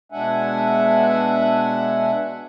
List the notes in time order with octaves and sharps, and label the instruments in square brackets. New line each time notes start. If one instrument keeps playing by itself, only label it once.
[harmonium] B2 G#3 D4 E5 F#5 G#5